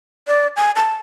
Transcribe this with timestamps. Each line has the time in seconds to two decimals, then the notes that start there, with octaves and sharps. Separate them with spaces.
0.27 D5
0.56 G#5
0.76 A5